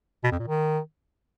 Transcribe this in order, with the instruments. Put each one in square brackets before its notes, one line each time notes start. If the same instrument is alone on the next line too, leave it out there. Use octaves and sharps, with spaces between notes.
[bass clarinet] B2
F2
A#2
D#3